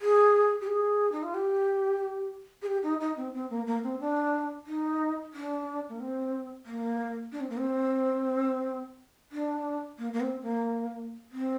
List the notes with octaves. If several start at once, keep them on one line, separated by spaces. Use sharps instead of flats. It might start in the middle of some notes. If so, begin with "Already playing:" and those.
G#4
G4
G#4
D#4
F4
G4
G#4
G4
D#4
D#4
C4
C4
A#3
A#3
C4
D4
D#4
D4
A#3
C4
A#3
D4
C4
A#3
C4
D4
A#3
A#3
C4
A#3
C4